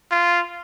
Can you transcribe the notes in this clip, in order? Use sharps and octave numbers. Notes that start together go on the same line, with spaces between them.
F4